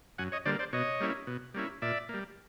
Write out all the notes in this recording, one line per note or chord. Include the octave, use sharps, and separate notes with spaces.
F#2 F#5 G#5
C#5 D#5
D3 G3 A#3 C5 D5
C5 D5
B2 C#5 D#5
G3 A#3 C#4 E4
B2
G3 A#3 C#4 E4
A#2 D5 E5
G3 A#3